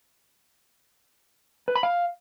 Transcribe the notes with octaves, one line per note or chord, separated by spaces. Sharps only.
B4
B5
F5